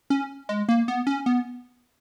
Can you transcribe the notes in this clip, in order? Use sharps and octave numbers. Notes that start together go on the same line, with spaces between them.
C#4
G#3
A#3
B3
C#4
B3